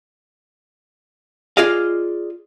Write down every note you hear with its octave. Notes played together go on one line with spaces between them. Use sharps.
F4 G#4 D5 D#5 F5